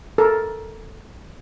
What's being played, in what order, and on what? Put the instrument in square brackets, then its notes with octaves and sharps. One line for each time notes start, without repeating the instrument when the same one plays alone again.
[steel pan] A4 A#4